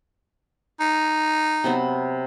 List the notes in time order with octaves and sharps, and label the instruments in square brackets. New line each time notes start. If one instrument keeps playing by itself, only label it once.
[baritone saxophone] D#4
[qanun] C3 F#3 B3